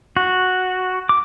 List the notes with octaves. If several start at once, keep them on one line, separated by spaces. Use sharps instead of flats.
F#4
D6